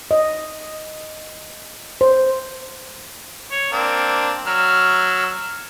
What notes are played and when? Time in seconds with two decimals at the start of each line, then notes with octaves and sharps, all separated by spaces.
0.11 D#5
2.01 C5
3.51 C#5
3.72 A#3 C4 D4
4.47 F#3 E6 F6